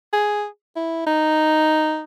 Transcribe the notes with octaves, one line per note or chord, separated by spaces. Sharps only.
G#4
E4
D#4